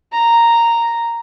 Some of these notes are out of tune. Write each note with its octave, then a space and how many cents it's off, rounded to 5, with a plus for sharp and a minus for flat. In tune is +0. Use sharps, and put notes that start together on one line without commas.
A#5 -5